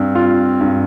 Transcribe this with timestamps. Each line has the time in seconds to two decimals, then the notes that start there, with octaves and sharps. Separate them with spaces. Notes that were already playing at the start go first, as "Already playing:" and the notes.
Already playing: G2 C4
0.15 F4
0.61 G2